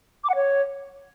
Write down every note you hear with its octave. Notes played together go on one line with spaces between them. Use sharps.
D6
F#5
C#5